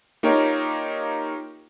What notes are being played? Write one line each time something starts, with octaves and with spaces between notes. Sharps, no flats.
A#3 D#4 F4 G4 A#4 C#5